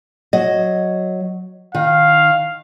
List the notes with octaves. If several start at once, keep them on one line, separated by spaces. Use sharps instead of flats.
F#3 D#5
D#3 F5